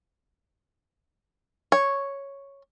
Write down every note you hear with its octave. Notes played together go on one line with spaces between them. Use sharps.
C#5